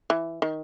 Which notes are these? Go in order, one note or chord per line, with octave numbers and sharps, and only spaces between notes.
E3
D#3